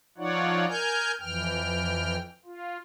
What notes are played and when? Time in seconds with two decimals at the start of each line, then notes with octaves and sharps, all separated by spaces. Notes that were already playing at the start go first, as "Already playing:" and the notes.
0.18 F3 D#4 F4 C#5 D5 F#5
0.68 A#4 G#5 F6 G6
1.20 F2 E3 G5 F6
2.45 F4